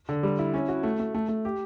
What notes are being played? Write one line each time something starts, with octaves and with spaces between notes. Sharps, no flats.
D3
G3
E4
C#4
F#4
A3
A3
A3
A3
G4